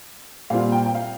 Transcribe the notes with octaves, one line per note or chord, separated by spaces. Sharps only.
A#2 G3 C4 F4 F5
G5
G5
F5